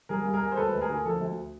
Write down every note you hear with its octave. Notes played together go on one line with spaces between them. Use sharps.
G3 G#4 A#4
G2
G#4 A#4
G2
C5
D2 A4 B4
D2
G#4 A#4
D3
F3 A4
D2